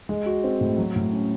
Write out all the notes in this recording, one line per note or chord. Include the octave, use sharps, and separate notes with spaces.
G#3
F#4
C4
A2
F#3
A2
C#4